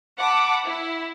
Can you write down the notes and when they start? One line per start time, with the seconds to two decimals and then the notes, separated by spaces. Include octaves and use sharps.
0.19 F#5 A5 B5 D6
0.66 E4